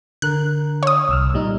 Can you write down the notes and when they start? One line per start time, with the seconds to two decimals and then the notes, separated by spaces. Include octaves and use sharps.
0.22 D3 A#4 F#6
0.83 C#5 D#6
1.09 C2 E6 F6
1.34 A#2 G3 D#4